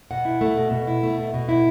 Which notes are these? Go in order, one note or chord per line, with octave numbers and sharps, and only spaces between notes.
B2 F#5
E4
A3
B2
B2
E4
A3
B2
B2
E4